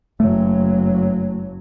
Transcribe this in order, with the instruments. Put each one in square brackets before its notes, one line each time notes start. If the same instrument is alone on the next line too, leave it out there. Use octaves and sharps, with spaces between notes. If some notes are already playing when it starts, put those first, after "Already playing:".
[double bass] F#1 F#3 [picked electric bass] A3